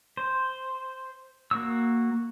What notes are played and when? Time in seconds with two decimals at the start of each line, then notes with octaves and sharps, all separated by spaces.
0.17 C5
1.51 A#3 F#4 E6